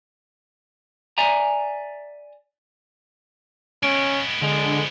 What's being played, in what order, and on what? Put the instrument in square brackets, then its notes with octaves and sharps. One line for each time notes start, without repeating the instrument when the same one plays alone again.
[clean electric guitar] D5 E5 G#5 A#5
[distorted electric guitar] G#3 B3 [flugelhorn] C#4 [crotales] D7
[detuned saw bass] D3 [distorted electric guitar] F3 B3 [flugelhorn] G#3